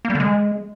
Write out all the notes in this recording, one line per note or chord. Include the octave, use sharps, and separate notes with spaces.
A#3
G3
D3
G#3